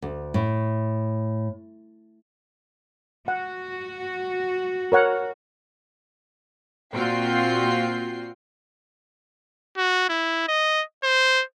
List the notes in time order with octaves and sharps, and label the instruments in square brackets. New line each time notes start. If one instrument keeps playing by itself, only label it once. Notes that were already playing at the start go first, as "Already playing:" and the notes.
[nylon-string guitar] D2
A2
[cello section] F#4 [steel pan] F#5
[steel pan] A#4 C#5 F#5
[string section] A#2 C4 F4 F#4 G5 C7
[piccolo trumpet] F#4
E4
D#5
C5